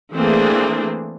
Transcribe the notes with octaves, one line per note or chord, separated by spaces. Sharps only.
E3 A3 A#3 C4 D4 G#4